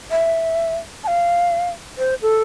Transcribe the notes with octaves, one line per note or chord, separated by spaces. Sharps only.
E5
A5
F5
C5
A4